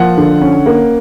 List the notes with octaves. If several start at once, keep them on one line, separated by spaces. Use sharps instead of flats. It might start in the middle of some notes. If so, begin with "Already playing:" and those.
Already playing: F3 A#3 F#5
D3
C#4
A#3